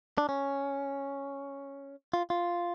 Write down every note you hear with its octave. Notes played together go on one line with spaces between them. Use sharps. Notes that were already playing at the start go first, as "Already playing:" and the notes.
D4
C#4
F4
F4